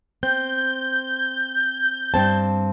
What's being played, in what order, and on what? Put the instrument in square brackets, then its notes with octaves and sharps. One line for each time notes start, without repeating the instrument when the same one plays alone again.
[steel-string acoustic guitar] C4 [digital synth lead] G6
[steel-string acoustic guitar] G2 C4 A5